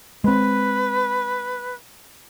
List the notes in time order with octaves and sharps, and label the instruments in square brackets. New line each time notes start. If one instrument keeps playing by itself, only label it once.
[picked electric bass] G#3 C4 [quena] B4